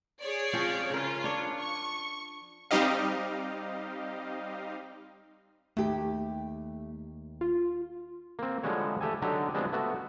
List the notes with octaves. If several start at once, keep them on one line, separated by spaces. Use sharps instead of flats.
G#4 C#5 D5
F3 C4 C#4
C#3 C#4 F4 A#4
D4 C#5
C#6
G3 C4 D#4 G4 D#5 F5
D#2 A3 G4
F4
A#3 C4
D3 F3 G3 G#3 F#4 C#5
A3 G4 A4 G#5
D3 F#3 D4 D#4 G4
F3 G3 G#3 B3 C4 D4
A3 B3 F#4